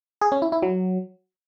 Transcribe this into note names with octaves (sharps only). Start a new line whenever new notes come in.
G#4
C#4
E4
E4
F#3